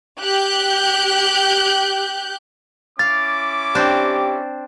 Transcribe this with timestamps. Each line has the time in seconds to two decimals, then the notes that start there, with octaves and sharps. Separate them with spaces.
0.21 G4 F#6 G6
2.99 C#4 E4 F5 D6 A6
3.75 C4 D4 G4